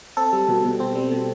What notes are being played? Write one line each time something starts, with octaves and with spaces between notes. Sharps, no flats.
C4 A4
G3
B2
B2
C4
G3
B2